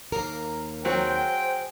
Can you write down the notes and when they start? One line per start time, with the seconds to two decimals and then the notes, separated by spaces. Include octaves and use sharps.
0.12 D#2 A#3 A#4
0.85 F#3 C4 G#4 C5 F#5 G5